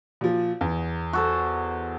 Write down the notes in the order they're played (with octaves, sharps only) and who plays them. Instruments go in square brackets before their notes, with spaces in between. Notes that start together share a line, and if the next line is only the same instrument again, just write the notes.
[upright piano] A#2 F3
E2
[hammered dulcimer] F#4 A4 C5